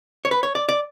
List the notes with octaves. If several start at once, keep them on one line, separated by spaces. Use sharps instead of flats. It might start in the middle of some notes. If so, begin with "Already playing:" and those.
C#5
B4
C#5
D5
D5